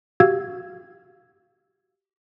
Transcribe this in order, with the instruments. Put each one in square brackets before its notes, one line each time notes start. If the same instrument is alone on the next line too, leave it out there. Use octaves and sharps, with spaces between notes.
[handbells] F#4 G4 F5 E6 G#6